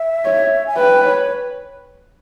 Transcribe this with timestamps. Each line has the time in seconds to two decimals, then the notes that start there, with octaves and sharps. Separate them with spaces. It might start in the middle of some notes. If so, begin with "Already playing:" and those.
Already playing: E5
0.25 C#5
0.67 G#5
0.77 B4 G5
1.04 C#5